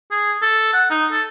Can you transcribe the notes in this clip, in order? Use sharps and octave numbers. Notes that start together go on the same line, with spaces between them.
G#4
A4
F#5
D#4
A4